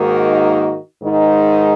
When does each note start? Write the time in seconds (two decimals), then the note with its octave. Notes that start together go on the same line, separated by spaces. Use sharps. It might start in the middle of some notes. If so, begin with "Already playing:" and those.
Already playing: G#2 D#3 A#3 D#4 F#4
1.02 G#2 D#3 G#3 D#4